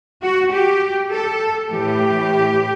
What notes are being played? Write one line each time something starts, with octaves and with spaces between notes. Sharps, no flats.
F#4
G4
A4
A2 E3 G4